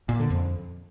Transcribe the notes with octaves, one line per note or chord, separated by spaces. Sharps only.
A#2
D3
F2